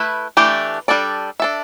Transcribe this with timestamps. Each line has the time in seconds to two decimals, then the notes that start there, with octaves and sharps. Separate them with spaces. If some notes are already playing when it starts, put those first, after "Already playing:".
Already playing: A3 E4 B4 E5
0.37 E3 A3 D4 G4
0.88 G3 D4 A4 D5
1.40 D4 A4 E5